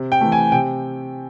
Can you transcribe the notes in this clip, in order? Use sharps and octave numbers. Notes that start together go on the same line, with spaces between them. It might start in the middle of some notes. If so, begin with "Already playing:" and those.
Already playing: C3
G5
E3 A3
G#5
C3 G5